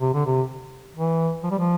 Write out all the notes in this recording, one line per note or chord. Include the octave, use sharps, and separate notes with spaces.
C3
D3
C3
E3
F3
G3
F3